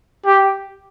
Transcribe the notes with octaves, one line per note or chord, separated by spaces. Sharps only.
G4